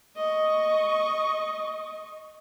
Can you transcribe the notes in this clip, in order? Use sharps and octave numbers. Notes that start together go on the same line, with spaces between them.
D#5 C#6